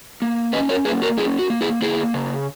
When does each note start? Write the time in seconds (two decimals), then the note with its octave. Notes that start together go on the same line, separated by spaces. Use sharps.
0.22 A#3
0.53 C#4 B4 D#5
0.69 A#4 C#5
0.85 A#3 G#4 B4
1.02 F#4 A#4
1.18 C#4 E4 G#4
1.39 F#4
1.50 A#3
1.61 E4 G#4
1.82 A#3 E4 G#4
2.14 C#3